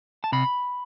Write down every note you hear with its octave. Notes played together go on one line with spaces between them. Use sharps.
A5
C3 B5